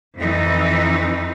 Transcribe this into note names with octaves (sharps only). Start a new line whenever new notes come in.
F2 E3 D#4